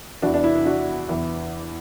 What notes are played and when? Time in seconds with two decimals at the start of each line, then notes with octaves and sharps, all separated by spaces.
0.22 E3 D4 F#4
0.27 E2
0.34 D4
0.44 E4
0.55 E4
0.65 D4 F#4
1.09 E2 E3